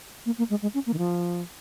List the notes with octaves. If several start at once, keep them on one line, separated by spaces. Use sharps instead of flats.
A#3
A#3
G#3
G#3
C#4
A#3
D#3
F3